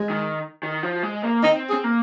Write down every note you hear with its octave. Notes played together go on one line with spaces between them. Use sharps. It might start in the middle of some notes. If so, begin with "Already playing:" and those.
Already playing: G#3
D#3
D#3
F3
G#3
A#3
C4 D#4
G#4
C4
A#3